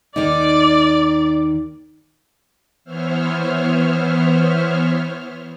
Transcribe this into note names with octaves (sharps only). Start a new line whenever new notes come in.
D#2 D#3 D#4 D5
E3 B3 C5 C#5 E5 F6